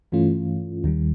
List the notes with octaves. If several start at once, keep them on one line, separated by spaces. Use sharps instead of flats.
G2 E3 A3 C#4 F4
D#2 D#3 G3